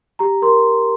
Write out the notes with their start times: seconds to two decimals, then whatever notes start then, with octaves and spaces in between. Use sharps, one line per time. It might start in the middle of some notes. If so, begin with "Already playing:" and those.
0.19 G4 A#5
0.42 A#4 C6